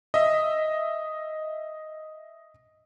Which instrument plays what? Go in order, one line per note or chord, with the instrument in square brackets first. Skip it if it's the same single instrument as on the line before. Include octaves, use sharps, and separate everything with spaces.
[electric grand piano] D#5 E5